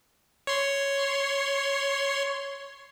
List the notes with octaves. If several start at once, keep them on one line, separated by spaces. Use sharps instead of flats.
C#5 C6